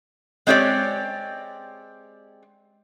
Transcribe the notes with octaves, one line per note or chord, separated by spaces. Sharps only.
G#3 C4 G4 C#5 D5